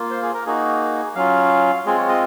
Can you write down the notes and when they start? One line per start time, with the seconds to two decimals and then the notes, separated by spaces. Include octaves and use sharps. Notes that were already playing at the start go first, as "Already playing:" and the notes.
Already playing: A#3 F4
0.11 C5
0.22 G#4
0.34 A#4
0.46 A#3 D#4 F#4 G#4
1.15 F#3 C#4 F4 F5
1.86 G#3 C4 F4 G#4
1.97 C#5
2.09 D#5